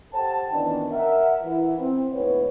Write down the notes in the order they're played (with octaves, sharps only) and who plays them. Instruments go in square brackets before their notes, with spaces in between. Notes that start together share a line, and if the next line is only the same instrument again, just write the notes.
[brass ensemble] G4 A4 C5 F#5 G5 A5
A#2 D#3 E3 B3 C#4 D4
A#4 E5 F#5
E3 E4
C4
D2 G#2 B3 E4 B4 C#5